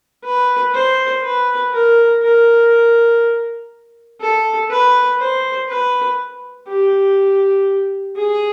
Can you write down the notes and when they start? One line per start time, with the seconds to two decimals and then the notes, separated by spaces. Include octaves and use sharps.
0.24 B4
0.74 C5
1.23 B4
1.73 A#4
2.22 A#4
4.21 A4
4.70 B4
5.20 C5
5.69 B4
6.68 G4
8.17 G#4